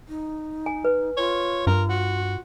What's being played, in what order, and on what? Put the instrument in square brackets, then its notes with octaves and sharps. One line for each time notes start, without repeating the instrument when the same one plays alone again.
[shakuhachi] D#4
[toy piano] G#5
B4
[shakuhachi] F4 [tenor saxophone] C#5
[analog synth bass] G2 [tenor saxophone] A#4
[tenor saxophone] F#4